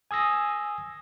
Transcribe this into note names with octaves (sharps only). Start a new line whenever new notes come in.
G#5 D#6 E6 A#6